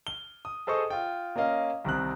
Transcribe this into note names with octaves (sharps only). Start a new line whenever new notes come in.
G7
D#6
G#4 A4 C5 D#5 C#6 D#6
F4 G5
A#3 C#4 A#4 D#5 F5
C2 D#3 C4 F#6